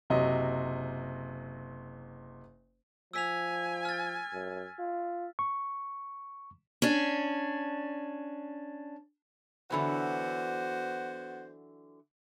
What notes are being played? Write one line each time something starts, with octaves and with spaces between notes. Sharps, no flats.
F#1 C3 F#3 D#5
F3 G#5 E6 B6 F7
F6 A6
F#2
F4
C#6
C#4 D4
D3 E3 F#3 B3 F#4 C5